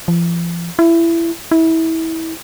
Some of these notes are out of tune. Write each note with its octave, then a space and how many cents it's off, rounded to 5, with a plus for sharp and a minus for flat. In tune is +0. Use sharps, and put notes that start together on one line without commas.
F3 -40
E4 +20
E4 -25